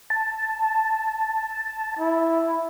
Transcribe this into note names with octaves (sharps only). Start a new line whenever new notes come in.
A5
E4